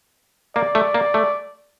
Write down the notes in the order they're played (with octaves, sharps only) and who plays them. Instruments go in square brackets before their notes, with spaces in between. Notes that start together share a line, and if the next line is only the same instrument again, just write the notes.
[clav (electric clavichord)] A#3 [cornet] D5
[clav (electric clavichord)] A3
A#3
A3